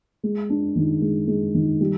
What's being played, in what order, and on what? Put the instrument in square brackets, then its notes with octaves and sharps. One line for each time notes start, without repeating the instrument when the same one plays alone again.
[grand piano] G#3
D4
D#3
G#3
G#3
D#3
G3